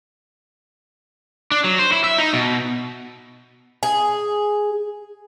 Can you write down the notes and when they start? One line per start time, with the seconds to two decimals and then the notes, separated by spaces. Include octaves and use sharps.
1.51 D4
1.64 F#3
1.79 C5
1.92 E4
2.04 E5
2.18 D#4
2.33 B2
3.83 G#4